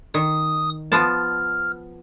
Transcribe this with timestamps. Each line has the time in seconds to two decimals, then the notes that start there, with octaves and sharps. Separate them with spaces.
0.14 D#3 D#6
0.92 F3 B3 A5 F6